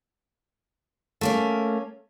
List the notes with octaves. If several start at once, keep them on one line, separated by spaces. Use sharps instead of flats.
A3 A#3 C#4